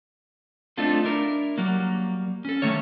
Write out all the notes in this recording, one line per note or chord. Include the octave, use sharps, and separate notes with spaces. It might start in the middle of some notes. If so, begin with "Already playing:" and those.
A3 C4 D4 D#4 F4 A4
D4 E4 A#4
F#3 G3 A#3
C#4 A4
D#3 A3 A#3 C#5